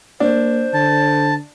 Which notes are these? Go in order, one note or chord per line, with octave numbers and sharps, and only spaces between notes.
A#3 D4 C5
D3 A5